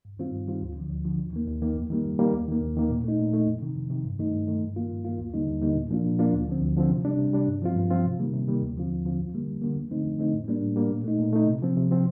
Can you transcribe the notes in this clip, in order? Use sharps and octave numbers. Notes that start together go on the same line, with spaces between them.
G2
D#3 G3 C4 F4
G2
D#3 G3 C4 F4
D2
D3 F3
D2
D3 F3
D#2
D#3 A#3
D#2
D#3 A#3
F2
D#3 G3 A#3
F2
D#3 G3 A#3
D#2
D#3 A#3
D#2
D#3 A#3
A#2
A3 D#4
A#2
A3 D#4
F2
C3 D#3
F2
C3 D#3
G2
D#3 A3 D#4
G2
D#3 A3 D#4
G2
D#3 A#3 F4
G2
D#3 A#3 F4
D#2
D3 G3 A#3 D#4
D#2
D3 G3 A#3 D#4
A#2
F3 A#3 D4 F4
A#2
F3 A#3 D4 F4
D2
D3 F3 C4
D2
D3 F3 C4
C3
G3 D4
C3
G3 D4
G2
F3 C4 F4
G2
F3 C4 F4
C3
D#3 G3 A#3
C3
D#3 G3 A#3
D#2
D3 F3 C4 F4
D#2
D3 F3 C4 F4
F2
D3 G3 A#3
F2
D3 G3 A#3
F2
D3 A3 C4 D#4
F2
D3 A3 C4 D#4
A2
G3 A#3 D4
A2
G3 A#3 D4
A#2
A3 D#4
A#2
A3 D#4
C3
F3 C4
C3
F3 C4